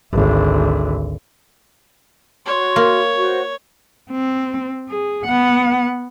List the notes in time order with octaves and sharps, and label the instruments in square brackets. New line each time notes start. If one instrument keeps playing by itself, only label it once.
[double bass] G#1 D2
[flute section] F#4 C6 [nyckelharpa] C#5
[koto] A#3
[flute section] F#4 C5 C#6
[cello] C4
G#4
B3 F#5